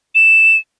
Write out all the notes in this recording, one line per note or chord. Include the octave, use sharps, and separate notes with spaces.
E7